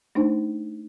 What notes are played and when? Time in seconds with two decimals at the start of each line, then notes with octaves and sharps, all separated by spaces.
0.15 A3 D4 D#4 C5